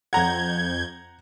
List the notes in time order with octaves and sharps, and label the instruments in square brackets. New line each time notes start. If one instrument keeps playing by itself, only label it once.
[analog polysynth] F2 G6 G#6 [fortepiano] F#5 A#5